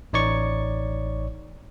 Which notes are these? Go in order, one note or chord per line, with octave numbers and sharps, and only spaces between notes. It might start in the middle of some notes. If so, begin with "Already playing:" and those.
A1 D#4 C#5 D5 C#6